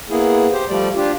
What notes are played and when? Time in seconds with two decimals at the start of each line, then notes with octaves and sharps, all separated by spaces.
0.10 A#3 B3 E4 G#4
0.53 G4 C5
0.69 F3 G3 A3 D5
0.96 D4 F4 G4